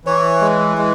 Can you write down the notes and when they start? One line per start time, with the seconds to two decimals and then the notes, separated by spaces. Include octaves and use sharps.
0.05 E3 C#5
0.41 G#3
0.77 G#3